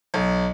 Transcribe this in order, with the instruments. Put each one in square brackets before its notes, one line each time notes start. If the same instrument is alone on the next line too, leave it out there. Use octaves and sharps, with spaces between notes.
[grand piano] B1